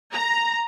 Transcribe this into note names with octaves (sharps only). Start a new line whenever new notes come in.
A#5